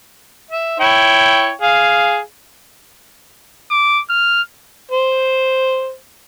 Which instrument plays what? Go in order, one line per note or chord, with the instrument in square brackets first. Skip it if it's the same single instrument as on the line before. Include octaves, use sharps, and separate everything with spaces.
[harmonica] E5
E4 C#5 G5
G#4 F5
[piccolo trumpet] D6
F6
[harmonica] C5